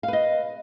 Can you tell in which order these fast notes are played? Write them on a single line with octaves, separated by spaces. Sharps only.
F5 B4 D#5